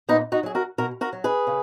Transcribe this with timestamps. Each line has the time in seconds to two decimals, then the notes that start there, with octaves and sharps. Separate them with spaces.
0.08 A#2 B3 D#4
0.32 D#4 F#4
0.43 F#3 G#4
0.55 F#4 A#4
0.78 B2 F#4 A#4
1.01 F#4 A#4
1.13 F#3
1.24 G#4 B4
1.47 C#3